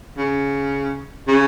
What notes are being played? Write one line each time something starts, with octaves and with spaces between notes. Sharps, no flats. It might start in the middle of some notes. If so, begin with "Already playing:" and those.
C#3
C#3